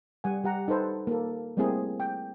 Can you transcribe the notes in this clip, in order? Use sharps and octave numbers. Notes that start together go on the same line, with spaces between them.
G3 F#5 G#5
G3 G4 F#5 A#5
D#4 A4 B4 C5
A#3 A4
G3 A3 A#3 C4 E4 G#4
G5